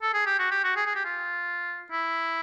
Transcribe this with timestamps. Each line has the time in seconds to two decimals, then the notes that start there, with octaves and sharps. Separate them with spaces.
0.02 A4
0.14 G#4
0.27 G4
0.39 F#4
0.51 G4
0.64 F#4
0.76 G#4
0.86 G#4
0.95 G4
1.05 F4
1.91 E4